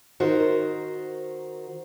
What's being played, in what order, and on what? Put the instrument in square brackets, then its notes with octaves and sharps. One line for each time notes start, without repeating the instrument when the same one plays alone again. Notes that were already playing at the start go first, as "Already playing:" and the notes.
[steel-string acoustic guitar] D#3 F#4 A#4 C5